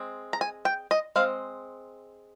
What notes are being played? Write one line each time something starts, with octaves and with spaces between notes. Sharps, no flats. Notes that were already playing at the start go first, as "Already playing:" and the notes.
Already playing: G#3 C4
A#5
G#5
G5
D#5
G#3 C4 F5